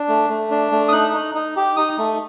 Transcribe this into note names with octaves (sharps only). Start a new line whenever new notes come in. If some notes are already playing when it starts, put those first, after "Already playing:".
Already playing: D4
A3
A3
D4
A3
D#6
D#4 F#6
D#4
D#4
G4
D#4 D#6
A3